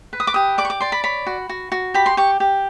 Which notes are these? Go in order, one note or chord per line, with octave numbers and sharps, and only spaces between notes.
B4
D#6
D6
G4 D#6
D5 D6
C#6
D6
D5 C6
B5
C#5 B5
F#4
F#4
F#4
G4 B5
C6
G4 C#6
G4